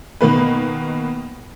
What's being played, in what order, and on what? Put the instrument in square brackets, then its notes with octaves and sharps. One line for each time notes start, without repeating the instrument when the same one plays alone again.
[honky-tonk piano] B2 D#3 A#3 B4